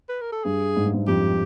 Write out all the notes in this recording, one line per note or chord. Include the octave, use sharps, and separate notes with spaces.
B4
A#4
A4
G2 G#4
G#2
G2
G#2
F2 G4